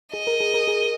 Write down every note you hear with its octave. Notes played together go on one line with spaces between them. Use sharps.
G#4 D#5
A#4
G#4
A#4
G#4